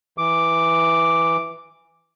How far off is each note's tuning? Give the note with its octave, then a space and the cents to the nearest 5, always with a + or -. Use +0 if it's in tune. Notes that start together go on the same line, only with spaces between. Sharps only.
E3 +0 D6 +0